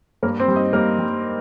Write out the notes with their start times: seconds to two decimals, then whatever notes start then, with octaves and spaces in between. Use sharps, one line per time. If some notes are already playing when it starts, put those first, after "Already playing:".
0.23 G2 A#3 A#4
0.40 C4 C5
0.48 G3
0.56 D#4 D#5
0.73 G3 A#3 A#4
0.99 G3